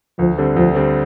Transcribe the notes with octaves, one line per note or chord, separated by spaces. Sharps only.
D2 F3
D3 G3 C4
D2 F3
D3 G3 C4